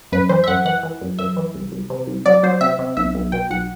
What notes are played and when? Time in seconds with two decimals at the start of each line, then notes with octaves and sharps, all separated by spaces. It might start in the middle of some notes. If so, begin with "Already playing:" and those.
0.12 F#2 B4
0.29 E3 C5
0.44 E5
0.48 F#2 F#5
0.65 E3 F#5
0.83 E3
1.01 F#2
1.19 F#2 E5
1.37 E3
1.55 C2
1.72 C2
1.90 C3
2.07 C2
2.26 F#3 D5
2.43 F#3 C5
2.61 C3 E5
2.79 C3
2.97 B1 E5
3.15 B1
3.32 B2 G5
3.50 B1 F#5